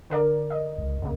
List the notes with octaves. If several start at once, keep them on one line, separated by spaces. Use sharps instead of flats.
D3 A#4 D5
D#5
C#2
D2 C#3 A#3